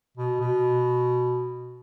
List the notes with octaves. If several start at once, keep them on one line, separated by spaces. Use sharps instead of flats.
B2
B2